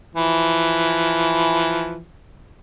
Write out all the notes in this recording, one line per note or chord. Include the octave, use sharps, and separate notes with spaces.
E3 F3